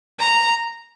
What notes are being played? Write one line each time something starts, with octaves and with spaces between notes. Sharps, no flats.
A#5